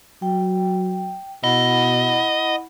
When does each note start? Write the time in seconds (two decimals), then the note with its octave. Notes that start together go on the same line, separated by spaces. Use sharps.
0.22 F#3 G5
1.44 B2 E4 D#5 F#5 B5